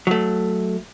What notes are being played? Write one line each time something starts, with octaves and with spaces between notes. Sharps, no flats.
F#3 A3